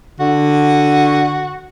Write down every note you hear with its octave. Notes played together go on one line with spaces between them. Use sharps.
D3 F#4